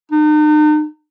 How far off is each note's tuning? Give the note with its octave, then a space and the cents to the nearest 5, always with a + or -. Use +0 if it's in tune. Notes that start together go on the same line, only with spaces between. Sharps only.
D#4 -40